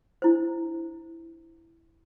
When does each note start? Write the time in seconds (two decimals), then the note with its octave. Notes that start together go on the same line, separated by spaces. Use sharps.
0.22 D4 E4 C5